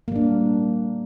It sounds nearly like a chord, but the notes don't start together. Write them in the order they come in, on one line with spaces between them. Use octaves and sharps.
A#3 G3 D4